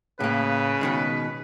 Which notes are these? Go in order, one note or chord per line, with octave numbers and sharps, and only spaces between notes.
A2 C#3 A#3 B4
B2 D#3 G#3